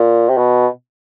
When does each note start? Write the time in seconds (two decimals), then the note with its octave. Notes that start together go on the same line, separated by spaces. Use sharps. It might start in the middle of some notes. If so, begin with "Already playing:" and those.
Already playing: A#2
0.29 C3
0.38 B2